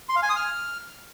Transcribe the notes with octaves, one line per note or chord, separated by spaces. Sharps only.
C6
F5
G#5
D#6
F6